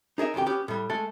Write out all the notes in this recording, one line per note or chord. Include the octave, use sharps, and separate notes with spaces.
D#4 G#4 A#4 E5
C2 F2 D#3 G4 G5
B3 C#4 G4
A2 G3
G#3 A3 A4